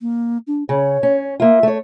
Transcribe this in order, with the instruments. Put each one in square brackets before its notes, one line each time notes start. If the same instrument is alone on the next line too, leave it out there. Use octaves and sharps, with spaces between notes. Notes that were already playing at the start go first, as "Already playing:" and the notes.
[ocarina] A#3
D4
[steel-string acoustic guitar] C#3 [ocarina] C#5
[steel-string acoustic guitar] C#4
[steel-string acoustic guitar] A#3 F4 [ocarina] E5
[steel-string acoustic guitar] A3 C#5